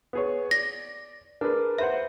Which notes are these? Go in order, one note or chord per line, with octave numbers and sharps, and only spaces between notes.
B3 G#4 C#5
D5 A#6
D4 G#4 A#4 B4
B4 C5 E5 F#5